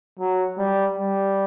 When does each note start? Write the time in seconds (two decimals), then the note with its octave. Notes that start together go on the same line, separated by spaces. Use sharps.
0.19 F#3
0.58 G3
0.97 G3